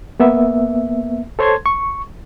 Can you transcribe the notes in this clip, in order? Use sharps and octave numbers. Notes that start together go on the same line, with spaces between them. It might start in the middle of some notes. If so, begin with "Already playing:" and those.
A#3 B3 E5
A4 C5 C#5 A5 C6 G#6
C#6